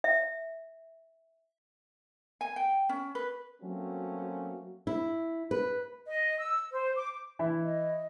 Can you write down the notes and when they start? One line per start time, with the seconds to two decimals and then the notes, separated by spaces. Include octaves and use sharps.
0.04 E5
2.41 G#5
2.56 G5
2.89 C#4
3.15 B4
3.62 F#3 A3 A#3 C4 C#4 F#4
4.87 E4
5.51 B4
6.06 D#5
6.38 E6
6.72 C5
6.96 D6
7.39 E3 E4
7.63 D#5